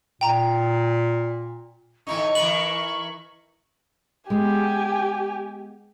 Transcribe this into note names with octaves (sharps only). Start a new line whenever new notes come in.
A#2 G5 A#5
A2 E3 D#4 C#6
E3 A#4 B4 F#7
G#3 B3 G4 G#5